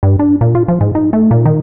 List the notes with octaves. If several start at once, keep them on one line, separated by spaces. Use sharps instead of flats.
G2
D4
A#2
F4
F3
G#2
D#4
A3
A#2
D#3